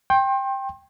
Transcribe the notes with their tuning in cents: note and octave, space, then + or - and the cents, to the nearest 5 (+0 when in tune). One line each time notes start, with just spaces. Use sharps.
G5 +10 C6 +40